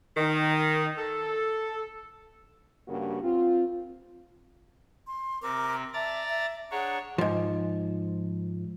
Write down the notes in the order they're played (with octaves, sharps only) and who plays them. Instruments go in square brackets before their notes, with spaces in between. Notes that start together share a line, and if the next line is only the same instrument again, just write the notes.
[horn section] D#3
A4
[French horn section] G2 C#3 A#3 F#4
C4 F4
[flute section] C6
[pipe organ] C3 C4 [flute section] A#4 D6
[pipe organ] D5 A#5 A6 [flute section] E5 A5
[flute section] E5
[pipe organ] D4 C#5 [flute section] G#4 F#5 A#5
[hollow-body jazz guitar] G#2 F3